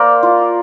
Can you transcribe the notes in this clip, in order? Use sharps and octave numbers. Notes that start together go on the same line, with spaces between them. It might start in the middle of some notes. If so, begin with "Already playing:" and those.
Already playing: A#3 A#4 C5 D5
F4